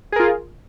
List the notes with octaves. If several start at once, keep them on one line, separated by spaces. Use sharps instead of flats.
F4 G#4 A#4